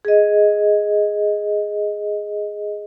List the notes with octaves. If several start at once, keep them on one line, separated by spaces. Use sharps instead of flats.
G#4 D#5